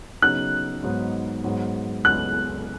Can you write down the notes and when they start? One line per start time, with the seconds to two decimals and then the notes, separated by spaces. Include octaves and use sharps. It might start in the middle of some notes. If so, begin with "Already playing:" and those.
0.22 C#3 F#3 B3 D#4 F#6
0.83 G#2 F#3 B3 D#4
1.44 G#2 F#3 B3 G#4
2.05 C#2 C#3 F#3 B3 F#6